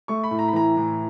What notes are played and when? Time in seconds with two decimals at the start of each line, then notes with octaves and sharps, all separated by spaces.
0.08 A3 C#6
0.24 B5
0.31 A2
0.39 A#5
0.48 B5
0.53 E3 A#5
0.77 A2